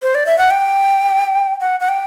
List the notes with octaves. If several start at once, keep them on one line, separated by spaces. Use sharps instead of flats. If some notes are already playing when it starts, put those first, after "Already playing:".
C5
D5
E5
F#5
G5
F#5
F#5
G5